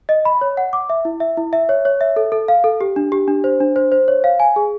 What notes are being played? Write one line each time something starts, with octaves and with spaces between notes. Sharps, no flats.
D#5
B5
C#5
F#5
D6
E5
E4
E5
E4
E5
C#5
C#5
E5
A4
A4
F5
A4
G4
D4
G4
D4
C5
D4
C5
C5
C#5
F5
G#5
G#4